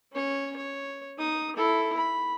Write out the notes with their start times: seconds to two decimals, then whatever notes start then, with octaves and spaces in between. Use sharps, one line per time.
0.12 C#4 C#5
0.57 C#5
1.17 D#4 D#6
1.56 E4 A4
1.97 B5